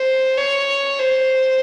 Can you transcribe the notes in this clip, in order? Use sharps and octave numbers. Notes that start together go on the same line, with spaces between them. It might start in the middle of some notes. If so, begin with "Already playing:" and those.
Already playing: C5
C#5
C5